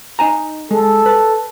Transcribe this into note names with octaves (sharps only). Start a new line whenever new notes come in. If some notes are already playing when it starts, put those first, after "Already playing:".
D#4 G#5 A#5
G#3 A4
B4 A5